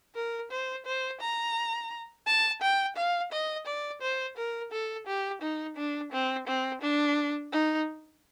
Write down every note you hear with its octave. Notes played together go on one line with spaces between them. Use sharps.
A#4
C5
C5
A#5
A5
G5
F5
D#5
D5
C5
A#4
A4
G4
D#4
D4
C4
C4
D4
D#4